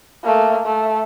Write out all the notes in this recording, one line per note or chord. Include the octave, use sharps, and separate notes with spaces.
A3 A#3
A3